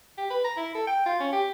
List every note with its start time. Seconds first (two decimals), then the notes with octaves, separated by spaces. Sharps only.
0.18 G4
0.30 B4
0.44 A#5
0.57 E4
0.75 A4
0.87 G5
1.06 F4
1.20 C#4
1.33 G4